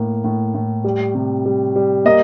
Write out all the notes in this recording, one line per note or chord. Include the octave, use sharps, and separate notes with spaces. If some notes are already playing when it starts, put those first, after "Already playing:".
Already playing: A2 A#3
A2
A2
G3
C3
G3
G3
A#3 D#5